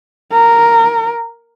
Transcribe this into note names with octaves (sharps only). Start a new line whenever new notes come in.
A#4